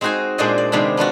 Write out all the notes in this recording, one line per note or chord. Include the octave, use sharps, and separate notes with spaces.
G#3 C4 D#4 F#4 C5 G#5
A#2 G#3 D4 C5 D5 D#5
D5
C3 D#3 G#3 B3 C4 D4
B3 D4 F4 F#4